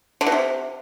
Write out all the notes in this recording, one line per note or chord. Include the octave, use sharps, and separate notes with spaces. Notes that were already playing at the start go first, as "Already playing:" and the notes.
D3
B2
C3